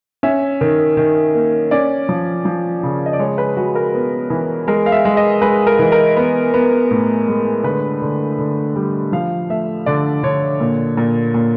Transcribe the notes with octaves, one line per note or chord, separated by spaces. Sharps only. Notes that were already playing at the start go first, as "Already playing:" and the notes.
C#4 E5
D#3
D#3
A#3
C#4 D5
F3
F3
C#3
D#5
D5
G#3 C#5
B4
G#3 F#4
A#4
B3
E3
G#3 A#4
F5
E5
G#3
D#5
G#3 B4
A#4
E3
A#4
B3
B3
A2
G#3
D3 B4
D3
D3
G3
F3 F5
A3 E5
D3 D5
D3 C#5
A#2
A#2
A#2